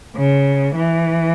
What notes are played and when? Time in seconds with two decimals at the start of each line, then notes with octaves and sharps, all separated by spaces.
0.17 C#3
0.76 E3